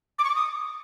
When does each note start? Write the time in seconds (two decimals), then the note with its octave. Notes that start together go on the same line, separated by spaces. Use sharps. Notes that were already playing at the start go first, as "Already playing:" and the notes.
0.18 D6
0.24 C#6
0.29 D6
0.35 D#6